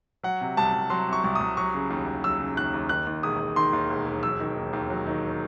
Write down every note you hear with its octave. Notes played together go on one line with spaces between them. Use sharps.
F#3 F#5
C3
C2 A5
C2
F#3 C6
C3 C#6
C2
D#6
C2
F#3 C#6
C#3
D#2
D#2
F#3 E6
C#3
D#2 F#6
D#2
D#3 F#6
D#2
E1 D#6
E1
D#3 C6
D#2
E1
E1
F#3 E6
D#3
D#2
D#2
F#3
D#3